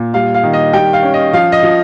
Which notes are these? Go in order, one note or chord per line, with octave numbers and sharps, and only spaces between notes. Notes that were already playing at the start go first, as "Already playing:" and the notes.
Already playing: A#2
G3 F5
F5
D#3
D#5
G3 G5
F5
C#4
D#5
F3 F5
D#5
F3